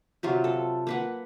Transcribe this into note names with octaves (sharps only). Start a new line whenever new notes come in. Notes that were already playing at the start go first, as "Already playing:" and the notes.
C3 F#3 F4
A4
A#3 B4 F#5